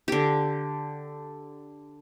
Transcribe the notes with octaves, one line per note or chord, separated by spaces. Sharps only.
D3 G4